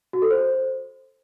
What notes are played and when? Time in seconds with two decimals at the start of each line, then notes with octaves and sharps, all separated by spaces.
0.13 F#4
0.22 A4
0.31 C5